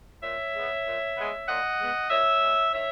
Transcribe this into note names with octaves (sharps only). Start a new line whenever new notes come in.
A#2 C#5 E5
G#3 B3
A#2
G#3 B3
A#2 D#5 F#5
G#3 B3
A#2 C#5 E5
G#3 B3
D#3 C#5 E5